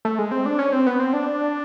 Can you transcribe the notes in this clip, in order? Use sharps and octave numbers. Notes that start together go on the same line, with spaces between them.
A3
G#3
C4
D4
C#4
C4
B3
C4
D4